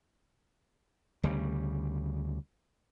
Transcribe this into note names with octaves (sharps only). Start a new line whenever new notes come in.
D2 C#3 G3